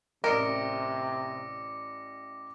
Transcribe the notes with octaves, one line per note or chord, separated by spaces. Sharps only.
A1 C3 A#4 D5 D#5 D6 A#6 C#7